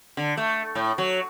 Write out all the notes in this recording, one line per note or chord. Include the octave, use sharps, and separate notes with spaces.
D3
A3
A2
F#3